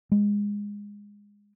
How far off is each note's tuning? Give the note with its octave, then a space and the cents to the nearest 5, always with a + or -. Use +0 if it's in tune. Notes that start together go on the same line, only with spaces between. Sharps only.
G#3 -20